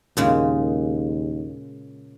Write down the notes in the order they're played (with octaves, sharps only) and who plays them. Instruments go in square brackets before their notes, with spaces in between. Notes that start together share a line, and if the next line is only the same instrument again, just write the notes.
[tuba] D#2 [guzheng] A#2 C#3 G#3